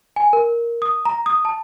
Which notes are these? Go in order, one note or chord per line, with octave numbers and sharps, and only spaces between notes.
G#5
A#4
D#6
A#5
D#6
A5